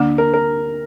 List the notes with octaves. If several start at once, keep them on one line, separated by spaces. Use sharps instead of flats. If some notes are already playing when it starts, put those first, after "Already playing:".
Already playing: D2 D3 A#3 D4
A#4
A#4